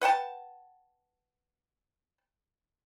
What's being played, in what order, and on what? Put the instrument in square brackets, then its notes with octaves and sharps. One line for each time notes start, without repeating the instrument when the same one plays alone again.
[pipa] B4 F#5 G5 A5